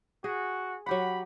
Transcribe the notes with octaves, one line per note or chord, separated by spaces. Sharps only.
F#4 G#4
F#3 G4 F#5 B5